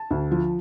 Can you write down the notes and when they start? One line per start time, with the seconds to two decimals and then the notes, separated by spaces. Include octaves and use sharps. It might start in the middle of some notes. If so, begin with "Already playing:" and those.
Already playing: A5
0.10 D2
0.31 F3